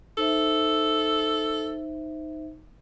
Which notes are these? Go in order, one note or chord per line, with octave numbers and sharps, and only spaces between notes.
D#4 A4 C5 E5